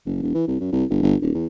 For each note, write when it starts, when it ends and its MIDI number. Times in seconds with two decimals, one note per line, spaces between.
0.06 0.21 30
0.23 0.31 28
0.35 0.46 52
0.48 0.57 36
0.60 0.68 42
0.72 0.85 36
0.90 1.01 31
1.03 1.16 31
1.22 1.32 27
1.35 1.47 40